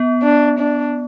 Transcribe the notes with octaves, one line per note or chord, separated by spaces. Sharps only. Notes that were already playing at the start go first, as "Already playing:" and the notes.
Already playing: B3
D4
D4